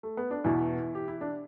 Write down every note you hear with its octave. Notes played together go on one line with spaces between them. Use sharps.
A3
B3
D4
E2 B2 E3 E4
G4
E4
D4